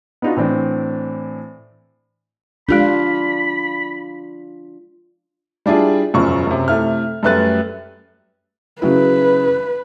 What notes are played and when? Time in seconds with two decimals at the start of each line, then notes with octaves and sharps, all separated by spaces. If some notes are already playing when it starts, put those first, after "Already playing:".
0.22 B3 D4 D#4 F4 F#4
0.37 A2 E3 C4 D4
2.69 G#3 D4 F4 G4 A4 B5
5.66 G3 D4 E4 F4 G#4
6.14 E1 F#2 C#3 F3 C#6
6.47 F#2 C3
6.68 C3 A3 E4 F6
7.23 F#2 G3 A3 B4 F#6 A6
8.82 C#3 F#3 E4 B4